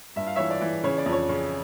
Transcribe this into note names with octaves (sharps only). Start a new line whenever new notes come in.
G2 E5
F5
E3 C#5 E5
D5
E3
C#3 C#5
D5
F2
C#5
C#3